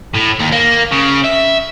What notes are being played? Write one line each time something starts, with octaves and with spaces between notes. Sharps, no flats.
A2
D#2
A#3
C#3
E5